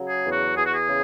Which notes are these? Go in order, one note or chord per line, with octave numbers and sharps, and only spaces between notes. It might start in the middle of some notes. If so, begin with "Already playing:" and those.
Already playing: C#3 F#3
G#4
E2
F#4
E2 G#4
F#4
G#4
C#3